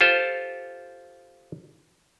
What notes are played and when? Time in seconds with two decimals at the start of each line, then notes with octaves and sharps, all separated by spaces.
0.01 F4 G4 A4 C5